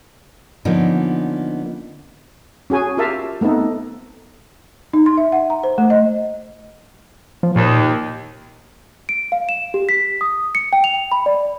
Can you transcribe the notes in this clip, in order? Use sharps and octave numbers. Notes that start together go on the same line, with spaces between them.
D3 F3 A#3 B3 C#4 D#4
C#4 F#4 G#4 G#5
F4 G4 A#4 E5 F5 A5
A3 B3 C4 D#4 A4
D#4
C6
E5
F#5
A#5
C5
A3
D#5
F3
D#2 A#2
D7
F5
E7
G4
B6
D#6
C#7
G5
F7
B5
D5